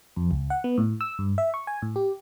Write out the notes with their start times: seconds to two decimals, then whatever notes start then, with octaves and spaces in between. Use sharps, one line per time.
0.16 F2
0.31 C#2
0.50 F#5
0.64 B3
0.78 A2
1.01 E6
1.19 G2
1.38 E5
1.54 C#6
1.67 G#5
1.82 A2
1.96 G4